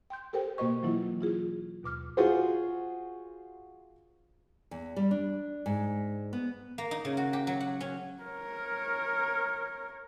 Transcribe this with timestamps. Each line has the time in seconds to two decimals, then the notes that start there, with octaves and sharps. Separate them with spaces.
0.10 G5 C6 G6
0.33 G4 A4 A#4 C5 G5
0.58 B2 A#3 F#4 C5 D#5 C#6
0.83 E3 F#3 A#3 E4 F4
1.21 E4 F4 G#4
1.83 D#2 B2 D6 F6
2.17 F4 F#4 G#4 C5
4.71 E2
4.96 G3
5.11 D4
5.66 G#2
6.33 B3
6.78 A#3
6.91 D#4
7.05 C#3
7.17 F#4
7.33 G4
7.47 F#3
7.61 F#5
7.81 C#4
8.24 A#4 C#5